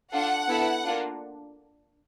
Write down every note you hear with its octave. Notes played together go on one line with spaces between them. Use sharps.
D4 F4 A4 F#5
B3 E4 A4
A#3 D4 F4